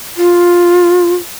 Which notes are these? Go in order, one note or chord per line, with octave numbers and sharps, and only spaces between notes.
F4